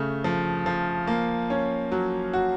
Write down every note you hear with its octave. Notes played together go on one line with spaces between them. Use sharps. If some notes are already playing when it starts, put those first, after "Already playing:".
Already playing: C#3 A3
F3
F3
A#3
C#4
F#3
F#4